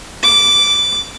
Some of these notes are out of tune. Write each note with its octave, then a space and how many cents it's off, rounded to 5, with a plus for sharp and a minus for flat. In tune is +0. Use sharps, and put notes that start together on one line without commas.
D6 -10